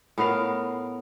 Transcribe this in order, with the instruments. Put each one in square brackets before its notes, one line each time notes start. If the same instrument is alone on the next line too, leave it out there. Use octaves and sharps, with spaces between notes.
[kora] A2 B3 A#4 F5